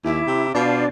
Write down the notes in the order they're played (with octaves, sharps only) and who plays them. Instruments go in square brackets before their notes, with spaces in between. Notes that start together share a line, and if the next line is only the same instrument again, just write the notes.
[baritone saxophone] D#2 [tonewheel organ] E4 [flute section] E5 D6
[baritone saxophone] C3
[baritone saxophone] B2 [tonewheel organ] D4 D5 [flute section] F4 C5 F5